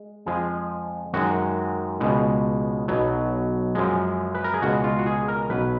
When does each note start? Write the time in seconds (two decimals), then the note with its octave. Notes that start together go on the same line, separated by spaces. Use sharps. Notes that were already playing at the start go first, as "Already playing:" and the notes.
Already playing: G#3
0.26 F2 F3 G#3 G#4
1.14 F#2 D#3 G#3 F#4
2.00 C#2 B2 G#3
2.88 B1 B2 F#3
3.75 F#2 F3 G#3
4.35 B4
4.44 A#4
4.54 G#4
4.62 C#2 B2 G#3 F#4
4.84 F4
4.99 F#4
5.06 G#4
5.28 A#4
5.50 B1 B2 F#3 B4